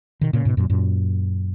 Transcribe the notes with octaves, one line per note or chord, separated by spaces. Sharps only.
B2 D#3
A#2 C#3
G#2 B2
F#2 A#2
F#2 A#2